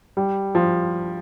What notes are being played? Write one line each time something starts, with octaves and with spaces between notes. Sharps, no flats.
G3
F3